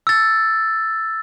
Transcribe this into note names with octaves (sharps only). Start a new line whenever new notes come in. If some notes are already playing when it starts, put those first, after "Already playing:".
E6 A6